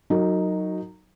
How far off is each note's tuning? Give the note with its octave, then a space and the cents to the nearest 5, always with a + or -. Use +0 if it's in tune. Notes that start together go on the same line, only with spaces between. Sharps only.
F#3 +0 D#4 +0 A#4 -35